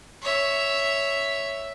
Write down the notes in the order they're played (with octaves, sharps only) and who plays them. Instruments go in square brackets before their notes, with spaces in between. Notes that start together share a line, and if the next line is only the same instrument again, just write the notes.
[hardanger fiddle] C#5 E5